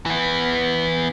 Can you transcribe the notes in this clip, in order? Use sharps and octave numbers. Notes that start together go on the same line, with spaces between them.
E3 B3